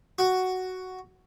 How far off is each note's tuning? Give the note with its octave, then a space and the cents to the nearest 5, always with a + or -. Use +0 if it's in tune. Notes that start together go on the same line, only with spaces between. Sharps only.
F#4 +5